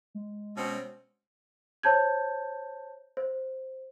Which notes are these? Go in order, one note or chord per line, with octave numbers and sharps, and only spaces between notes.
G#3
B2 C4 C#4
C5 C#5 A5 G6 G#6
C5